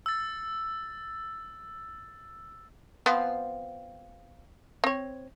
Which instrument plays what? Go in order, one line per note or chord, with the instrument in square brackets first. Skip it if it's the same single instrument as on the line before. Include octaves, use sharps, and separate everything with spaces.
[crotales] E6 A6
[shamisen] F3 B3 C4
C4 C#5